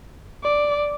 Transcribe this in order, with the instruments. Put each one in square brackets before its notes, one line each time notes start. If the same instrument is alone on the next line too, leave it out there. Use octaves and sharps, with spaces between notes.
[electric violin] D5